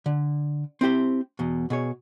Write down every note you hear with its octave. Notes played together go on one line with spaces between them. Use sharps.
D3
C4 E4 G4 C5
E2 B2
B2 G#4 C#5